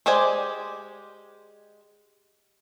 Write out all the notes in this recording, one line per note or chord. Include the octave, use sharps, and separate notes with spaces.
G#3 G4 C5 D5 G#5